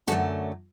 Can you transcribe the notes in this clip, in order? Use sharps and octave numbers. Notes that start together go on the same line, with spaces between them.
F#2 D3 F#3 A3 F#4 A4